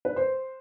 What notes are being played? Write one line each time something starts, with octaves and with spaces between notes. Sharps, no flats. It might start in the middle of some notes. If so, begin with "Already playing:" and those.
B4
C5